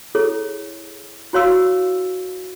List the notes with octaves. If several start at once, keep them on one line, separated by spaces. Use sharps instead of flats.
E4 G#4 A4 C#5
E4 F#4 C#5 F5 C6 E6